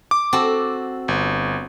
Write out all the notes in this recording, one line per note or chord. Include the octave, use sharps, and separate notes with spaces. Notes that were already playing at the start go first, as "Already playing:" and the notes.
D6
C4 F#4 A4
G1